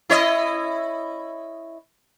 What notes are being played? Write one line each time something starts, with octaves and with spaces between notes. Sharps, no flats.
E4 C#5 D#5